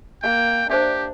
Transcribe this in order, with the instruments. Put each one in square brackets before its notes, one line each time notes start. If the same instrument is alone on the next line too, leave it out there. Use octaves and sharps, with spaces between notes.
[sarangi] A#3 [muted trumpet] G5
[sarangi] D4 [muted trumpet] G4 [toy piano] C5 D5 E5